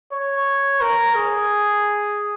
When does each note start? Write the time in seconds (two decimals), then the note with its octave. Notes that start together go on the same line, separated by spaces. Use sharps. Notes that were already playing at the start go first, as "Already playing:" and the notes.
0.13 C#5
0.81 A#4
1.15 G#4